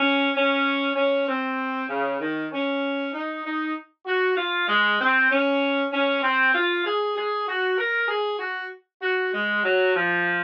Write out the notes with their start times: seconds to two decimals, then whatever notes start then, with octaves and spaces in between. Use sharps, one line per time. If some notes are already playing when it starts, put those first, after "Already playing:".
Already playing: C#4
0.34 C#4
0.96 C#4
1.28 C4
1.89 C#3
2.20 D#3
2.52 C#4
3.13 D#4
3.45 D#4
4.06 F#4
4.36 F4
4.68 G#3
5.00 C4
5.29 C#4
5.92 C#4
6.22 C4
6.54 F4
6.85 G#4
7.16 G#4
7.47 F#4
7.78 A#4
8.08 G#4
8.39 F#4
9.01 F#4
9.32 G#3
9.64 F#3
9.95 F3